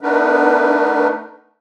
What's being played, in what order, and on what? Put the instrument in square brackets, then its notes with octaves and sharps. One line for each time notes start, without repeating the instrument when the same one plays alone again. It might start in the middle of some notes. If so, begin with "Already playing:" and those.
[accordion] A3 B3 D4 D#4 A#4 B4